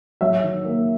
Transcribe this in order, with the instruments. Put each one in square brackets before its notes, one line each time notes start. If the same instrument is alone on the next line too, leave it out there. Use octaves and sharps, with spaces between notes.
[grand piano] F#3 [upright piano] E5
[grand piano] D#3
A#3